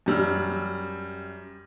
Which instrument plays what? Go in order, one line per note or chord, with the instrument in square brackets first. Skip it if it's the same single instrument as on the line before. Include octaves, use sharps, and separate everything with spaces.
[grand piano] F#2 G3 E6 F6